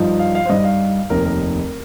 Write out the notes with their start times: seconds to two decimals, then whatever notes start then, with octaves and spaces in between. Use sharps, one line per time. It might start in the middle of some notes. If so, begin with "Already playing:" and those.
Already playing: G2 F3 D#4
0.19 F5
0.35 F5
0.46 C5
0.49 G2 G3 D#4 D#5
0.64 F5
1.10 F1 D#2 D#3 A#4
1.25 A#4